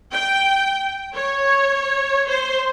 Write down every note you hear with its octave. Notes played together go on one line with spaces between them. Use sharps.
G5
C#5
C5